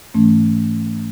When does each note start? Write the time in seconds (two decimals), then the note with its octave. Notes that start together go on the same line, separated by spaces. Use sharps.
0.14 G#2 E3 A3 C#4